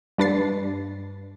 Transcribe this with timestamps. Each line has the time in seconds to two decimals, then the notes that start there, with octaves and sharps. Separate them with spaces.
0.18 G2 D4 B4 A6 C7